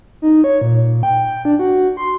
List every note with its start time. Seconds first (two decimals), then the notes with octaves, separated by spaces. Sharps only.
0.22 D#4
0.44 C#5
0.62 A#2
1.03 G5
1.45 D4
1.59 F#4
1.97 C6